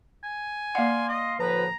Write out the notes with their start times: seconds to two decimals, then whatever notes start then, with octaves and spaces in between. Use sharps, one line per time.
0.23 G#5
0.75 A#3 D5 F5 F#5 C6
1.09 D#5
1.40 A2 D3 F3 F#4 B4 A#5